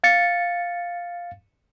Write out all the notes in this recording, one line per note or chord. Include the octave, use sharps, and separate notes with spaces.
F5 A6 C#7